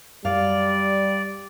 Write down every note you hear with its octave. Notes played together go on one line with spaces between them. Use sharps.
F#2 G3 D5 F5